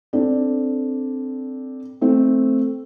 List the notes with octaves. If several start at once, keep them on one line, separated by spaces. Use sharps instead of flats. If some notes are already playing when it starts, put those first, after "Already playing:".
C4 D4 A4
A3 C4